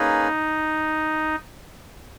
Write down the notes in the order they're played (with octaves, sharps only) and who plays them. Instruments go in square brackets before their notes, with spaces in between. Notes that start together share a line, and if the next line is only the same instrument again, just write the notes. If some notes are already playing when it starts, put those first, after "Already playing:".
Already playing: [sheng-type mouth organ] A#3 C#4 G#4 B4 [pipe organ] D#4